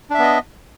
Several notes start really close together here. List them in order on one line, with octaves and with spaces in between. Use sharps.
D4 E5 B3 D#5